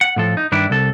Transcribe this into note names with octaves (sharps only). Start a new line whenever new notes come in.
F#5
A2 F3 A4
D#4
G2 D#3 D4 E4
C2 A4